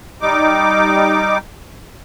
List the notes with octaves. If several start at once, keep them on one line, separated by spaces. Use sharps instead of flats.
G3 D#4 D6